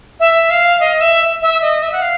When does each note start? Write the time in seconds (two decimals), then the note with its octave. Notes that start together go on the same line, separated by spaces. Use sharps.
0.20 E5
0.50 F5
0.80 D#5
1.01 E5
1.42 E5
1.62 D#5
1.82 E5
1.92 F#5
2.02 F5